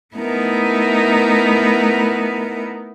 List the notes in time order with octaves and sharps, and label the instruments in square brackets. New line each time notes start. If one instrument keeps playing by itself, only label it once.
[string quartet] A3 B3 D#4 E4 A#4